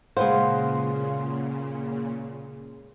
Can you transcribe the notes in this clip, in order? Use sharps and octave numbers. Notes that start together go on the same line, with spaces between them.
A#2 C#3 G#3 B4 C5 F5 F#5 C6